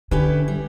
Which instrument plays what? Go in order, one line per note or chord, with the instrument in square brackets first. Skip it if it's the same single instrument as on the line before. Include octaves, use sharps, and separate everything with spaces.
[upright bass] D3 [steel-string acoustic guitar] C#4 E4 G4 B4
[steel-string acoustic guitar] G3